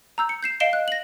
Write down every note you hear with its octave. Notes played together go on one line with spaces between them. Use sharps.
A#5 E6 G6
C#7
G6 C7 E7
D#5 F5 C7 D7 E7 G7
F#6
A#6 F#7